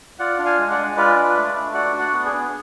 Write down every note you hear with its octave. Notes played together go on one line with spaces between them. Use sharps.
F4 D5 F#5
D4
F5 G#5
G#3
D5 F#5
G#3
F4 B4 D5
D4
A3
A3
F#4 D5 F#5
D4
D5 F#5
B3
G#4
B3